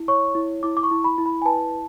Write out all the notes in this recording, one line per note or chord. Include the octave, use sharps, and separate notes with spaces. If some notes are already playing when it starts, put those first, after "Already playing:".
Already playing: E4
C#5 C#6
E4
E4 D6
D6
C#6
E4
B5
E4
B5
G#5
B4 A5